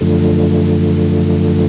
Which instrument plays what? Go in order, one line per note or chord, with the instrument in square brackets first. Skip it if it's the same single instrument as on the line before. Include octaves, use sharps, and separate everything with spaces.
[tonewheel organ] F#2 D3 F3 A3